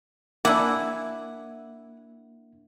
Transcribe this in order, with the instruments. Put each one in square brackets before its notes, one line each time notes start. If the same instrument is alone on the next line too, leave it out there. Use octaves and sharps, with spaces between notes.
[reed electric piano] A#3 D4 [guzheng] E4 G#5 [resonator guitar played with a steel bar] F#5 [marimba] D6 E6